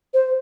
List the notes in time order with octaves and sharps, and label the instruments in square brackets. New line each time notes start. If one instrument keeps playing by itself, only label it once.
[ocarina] C5